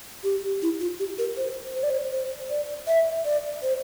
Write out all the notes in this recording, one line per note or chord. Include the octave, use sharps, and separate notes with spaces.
G4
E4
F4
G4
A#4
C5
C5
D5
C5
C5
D5
E5
D5
C5